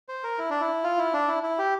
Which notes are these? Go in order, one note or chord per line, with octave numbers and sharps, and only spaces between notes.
C5
A#4
E4
D4
E4
F4
E4
D4
E4
E4
G4